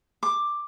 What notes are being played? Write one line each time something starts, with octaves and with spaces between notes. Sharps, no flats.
D6